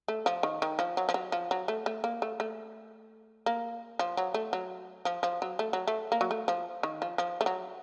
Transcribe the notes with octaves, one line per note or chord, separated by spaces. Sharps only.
A3
F3
D#3
D#3
F3
F#3
F3
F#3
F3
F#3
A3
A3
A#3
A3
A3
A#3
F3
F#3
A3
F#3
F3
F3
F#3
A3
F#3
A3
A#3
F#3
A3
F3
D#3
F3
F3
A3
F#3